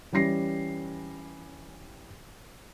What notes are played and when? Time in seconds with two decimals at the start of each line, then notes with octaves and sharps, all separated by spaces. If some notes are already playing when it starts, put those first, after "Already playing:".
0.12 E3 G3 C#4 A#6 C7